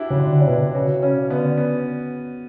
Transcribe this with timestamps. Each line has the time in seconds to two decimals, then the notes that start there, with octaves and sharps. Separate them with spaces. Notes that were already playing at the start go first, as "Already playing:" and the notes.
Already playing: D4 E4 F#4 G4
0.10 C#3
0.20 D3
0.33 D3
0.40 C#3
0.47 B2 E4
0.75 C#3 F#4
1.03 C#3 C#4
1.30 D3 B3
1.57 B3